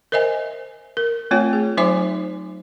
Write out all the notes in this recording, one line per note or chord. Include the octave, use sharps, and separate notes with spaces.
A#4 C5 D#5 E5 G#5
A#4
A3 C4 F4 C#5 G5
G#4
F#3 D#4 C5 E5 G#5 D6